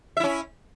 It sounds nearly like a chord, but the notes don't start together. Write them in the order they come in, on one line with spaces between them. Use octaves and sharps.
E5 E4 C#4